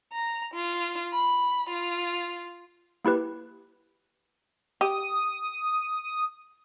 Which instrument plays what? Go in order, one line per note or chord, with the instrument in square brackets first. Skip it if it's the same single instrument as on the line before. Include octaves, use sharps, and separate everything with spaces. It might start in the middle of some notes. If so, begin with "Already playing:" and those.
[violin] A#5
F4
B5
F4
[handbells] A#3 E4 G4 B4
[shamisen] G4 [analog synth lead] D#6